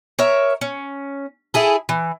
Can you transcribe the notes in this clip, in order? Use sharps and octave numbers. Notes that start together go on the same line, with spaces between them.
A#4 C#5 E5
C#4
E4 G#4 A4
E3